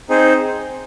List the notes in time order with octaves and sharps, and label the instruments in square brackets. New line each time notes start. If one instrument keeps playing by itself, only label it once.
[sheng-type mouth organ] C4 D#4 G#4 C5